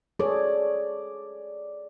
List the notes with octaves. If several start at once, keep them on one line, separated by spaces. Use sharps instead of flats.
G#4 A4 C#5 D5